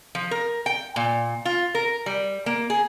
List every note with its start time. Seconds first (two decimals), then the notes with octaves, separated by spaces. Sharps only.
0.15 F3
0.31 A#4
0.66 G5
0.96 A#2
1.45 F4
1.75 A#4
2.06 G3
2.46 A#3
2.70 G#4